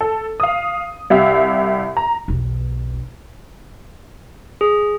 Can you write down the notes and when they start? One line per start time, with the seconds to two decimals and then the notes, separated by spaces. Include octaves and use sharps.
0.01 A4
0.40 F5 D#6
1.10 C2 G4 E5 F5
1.97 A#5
2.28 B1 E2
4.61 G#4